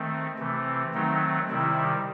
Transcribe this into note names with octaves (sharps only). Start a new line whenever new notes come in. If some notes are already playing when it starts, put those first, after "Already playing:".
Already playing: D#3 A3 C4
C3 E3 A3 C4
D#3 F#3 A3 C4 D#4
C3 D#3 G3 E4